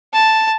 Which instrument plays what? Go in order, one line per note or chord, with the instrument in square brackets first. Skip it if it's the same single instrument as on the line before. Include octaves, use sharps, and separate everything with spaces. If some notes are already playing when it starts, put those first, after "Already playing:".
[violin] A5